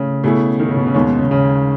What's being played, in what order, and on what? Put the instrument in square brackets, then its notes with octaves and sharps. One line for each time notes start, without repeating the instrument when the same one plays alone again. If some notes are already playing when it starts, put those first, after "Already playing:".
Already playing: [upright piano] A2 [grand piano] C#3
[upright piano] B2 A3 C#4 E4 G#4
[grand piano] D#3
C#3
B2
C#3
[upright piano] D#2 D#3 G#3 C#4 [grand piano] B2
[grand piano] B2
C#3
C#3